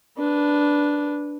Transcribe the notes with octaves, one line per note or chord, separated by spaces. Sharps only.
D4 B4